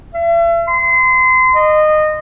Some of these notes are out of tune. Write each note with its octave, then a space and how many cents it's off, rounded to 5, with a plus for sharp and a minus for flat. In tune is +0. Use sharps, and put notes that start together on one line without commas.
E5 +40
C6 -30
D#5 -20